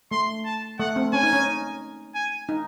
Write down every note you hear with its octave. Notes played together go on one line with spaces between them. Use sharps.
A3 C6
A5
A3 F#5
C4
C#4 G#5
D#4
C#4
G#5
D#4